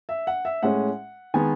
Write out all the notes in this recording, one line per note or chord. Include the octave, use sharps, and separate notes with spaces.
E5
F#5
E5
A2 G#3 C#4 F#5
D#3 G#3 B3 G#5